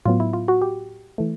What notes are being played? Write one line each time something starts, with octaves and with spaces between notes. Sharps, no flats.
A2 F#3 B3 F4
E4
F4
F#4
G4
E3 A3